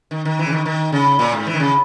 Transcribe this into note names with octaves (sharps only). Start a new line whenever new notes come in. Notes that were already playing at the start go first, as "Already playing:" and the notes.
D#3
D#3
E3
C#3
D#3
D#3
C#3
A#2
G#2
E3
D#3
C#3